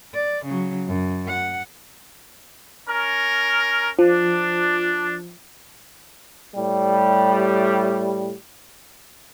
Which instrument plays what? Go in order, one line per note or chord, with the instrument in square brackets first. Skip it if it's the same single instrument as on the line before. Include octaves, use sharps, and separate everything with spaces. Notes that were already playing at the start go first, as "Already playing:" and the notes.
[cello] D5
C#3 F#3
F#2
F#5
[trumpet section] C#4 A#4
[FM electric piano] F3 [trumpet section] D4
[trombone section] A2 G3